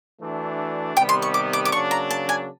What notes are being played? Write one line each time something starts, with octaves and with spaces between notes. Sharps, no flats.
E3 A3 D4 F#4
C3 D#3 G3 B3 G5
C6
C#6
D6
D6
D6
C#3 F#3 A#3 D4 C#6
A#5
A5
G#5